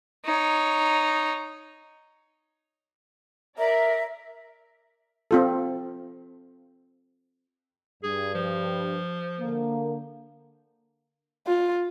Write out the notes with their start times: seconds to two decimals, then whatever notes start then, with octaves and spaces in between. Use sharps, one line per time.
0.25 D#4 C#5
3.58 A#4 D5 E5 A#5
5.31 C4 F4 A4
8.03 G2 G#4
8.34 F3
9.40 D3 A#3
11.47 F4